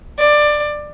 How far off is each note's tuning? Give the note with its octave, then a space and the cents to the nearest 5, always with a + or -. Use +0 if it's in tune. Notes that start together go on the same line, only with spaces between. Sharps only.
D5 +15